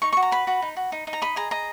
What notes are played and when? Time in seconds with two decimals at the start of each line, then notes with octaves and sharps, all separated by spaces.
0.02 D#4 C#6
0.13 F#4 C#6
0.22 A#5
0.31 B4 B5
0.47 F#4
0.62 D#4
0.76 F#4
0.92 D#4
1.07 D#4
1.13 A#5
1.22 D#5 B5
1.36 G#4 A#5
1.51 D#5 A#5